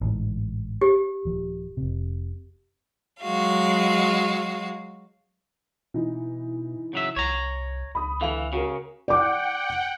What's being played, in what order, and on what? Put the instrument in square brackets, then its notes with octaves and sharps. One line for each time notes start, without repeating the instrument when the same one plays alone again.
[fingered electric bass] A1 D2 G#2
[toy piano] G4
[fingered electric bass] D#1 F3
F1 C3
[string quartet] F#3 G#3 F#4 F5
[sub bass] B2 [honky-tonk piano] E3 D#4
[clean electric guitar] C#3 F#3 E5
[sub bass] C2 [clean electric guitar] C#5 A#5
[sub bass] C#2 [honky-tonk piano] B5 D#6
[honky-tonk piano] D3 F5 F7 [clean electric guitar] E3
[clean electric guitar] C#3 [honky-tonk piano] F#4 A#4
[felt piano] D5 D6 [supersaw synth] F#5 G5